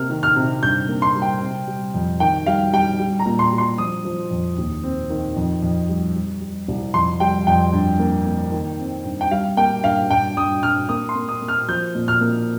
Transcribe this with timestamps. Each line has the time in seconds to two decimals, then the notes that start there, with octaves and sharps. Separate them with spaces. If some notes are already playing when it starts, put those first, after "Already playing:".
Already playing: C3 A#3 F6
0.10 D#3
0.23 F6
0.36 C3
0.63 G2 G6
0.89 A#3
1.02 C6
1.15 G3
1.22 G5
1.41 C3
1.67 G3
1.94 F2
2.20 D#3 G5
2.46 G3 F5
2.73 G3 G5
2.99 G3
3.19 A#5
3.26 A#2
3.39 C6
3.52 G3
3.58 C6
3.78 F3 D#6
4.05 F3
4.31 F2
4.57 D#2
4.83 C4
5.10 D#3
5.37 F2
5.62 F2
5.89 G3
6.15 G3
6.41 G3
6.68 C2
6.94 F2 C6
7.20 G3 G5
7.47 F2 G5
7.73 G2
7.99 A#3
8.26 A#3
8.52 D#3
8.79 C4
9.05 G2
9.21 G5
9.31 G3 F5
9.57 A#3 G5
9.84 G2 F5
10.10 G2 G5
10.37 G2 D#6
10.63 G2 F6
10.89 A#3 D#6
11.09 C6
11.15 A#3
11.29 D#6
11.42 A#3
11.48 F6
11.68 F3 G6
11.95 A#2
12.08 F6
12.21 A#3